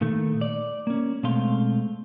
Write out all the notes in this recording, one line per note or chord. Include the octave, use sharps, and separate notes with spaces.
A#2 D#3 A3
D5
A#3 C#4
B2 G#3 A3 C4 F5 C6